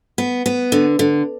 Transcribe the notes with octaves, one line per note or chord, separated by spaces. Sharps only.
B3
B3
D3
D3